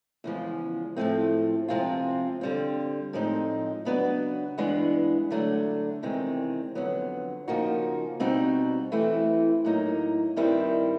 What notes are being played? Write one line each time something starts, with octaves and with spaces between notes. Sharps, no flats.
E2 C#3 F3 G#3
A2 F3 A3 C4
C3 F3 G#3 C4 F4
D3 G3 C4
A2 F3 G#3 C4 D#4
C#3 F#3 B3 D4 F#4
G2 E3 G#3 B3 D4
D3 F#3 A3 D4
E2 C3 D#3 G#3 C4
F2 D3 F#3 B3
C#3 F3 A#3 D#4 F#4
B2 G3 C4 D#4 F#4
E3 A3 C4 E4
A2 F#3 A#3 D#4
G2 D#3 G3 C4 E4